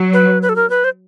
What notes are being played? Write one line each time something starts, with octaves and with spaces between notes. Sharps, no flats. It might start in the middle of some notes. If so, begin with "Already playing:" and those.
Already playing: F#3
B4
B4
A4
A#4
B4
C5